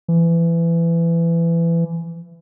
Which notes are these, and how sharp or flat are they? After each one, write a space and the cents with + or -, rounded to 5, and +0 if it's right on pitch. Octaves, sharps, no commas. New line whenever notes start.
E3 +25